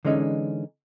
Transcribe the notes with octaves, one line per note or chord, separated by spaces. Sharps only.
D3 E3 G#3 C#4 D#4